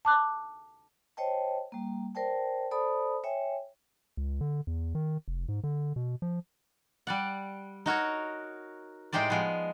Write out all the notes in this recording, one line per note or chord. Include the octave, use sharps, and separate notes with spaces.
A5 D6 F#6
C5 C#5 D#5 G5 A5
G3 A#3
A#4 C5 D5 G5 A5
A4 C5 D5 A5 B5 D#6
C#5 E5 G5 G#5
C#2
D3
E2
D#3
F1
G#2
D3
B2
F3
G3 D5 F#5
D#4 F#4 A#4 C#5
A2 G#3 D#4 G4 C5 D5
F3 G#3 B3